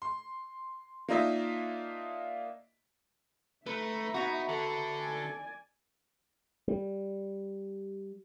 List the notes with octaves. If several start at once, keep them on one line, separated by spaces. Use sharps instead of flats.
C6
A#3 D4 D#4 F4 D#5 E5
A3 B4 E5 A#5
B3 D#4 E4 F#4
D3 A4
D5 G#5
G3